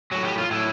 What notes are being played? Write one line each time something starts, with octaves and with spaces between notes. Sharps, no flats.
A2 F#3 F#4
G4
F4
A2 F#3 E4